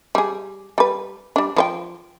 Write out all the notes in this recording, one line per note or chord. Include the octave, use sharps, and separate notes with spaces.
G3 G#4
G3 B4
G3 D4
F3 B4 G5